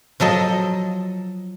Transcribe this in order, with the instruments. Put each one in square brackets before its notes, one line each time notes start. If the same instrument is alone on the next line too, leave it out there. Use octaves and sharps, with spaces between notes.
[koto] F3 F#3 A4 D#5